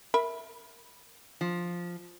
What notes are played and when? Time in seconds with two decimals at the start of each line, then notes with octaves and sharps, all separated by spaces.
0.14 A#4 E5 B5
1.41 F3